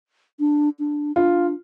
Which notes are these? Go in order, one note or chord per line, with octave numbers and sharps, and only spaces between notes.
D4
D4
D4 F4